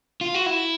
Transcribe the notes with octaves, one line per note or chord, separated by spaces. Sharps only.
F4
F#4
E4